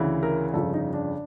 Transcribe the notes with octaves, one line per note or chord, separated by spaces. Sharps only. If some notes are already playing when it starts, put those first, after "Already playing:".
Already playing: D2 C#3 E3
A#4
G1 F2 C#3 A4
D#4
D4